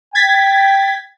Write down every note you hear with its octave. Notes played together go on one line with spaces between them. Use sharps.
G5 G#6 A6 B6